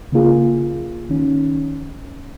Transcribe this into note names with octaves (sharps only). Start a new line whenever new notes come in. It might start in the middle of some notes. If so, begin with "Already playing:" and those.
C#3 A#3 F4 G#4
D#3 C#4